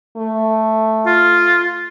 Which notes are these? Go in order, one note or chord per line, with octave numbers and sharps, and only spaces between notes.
A3
F4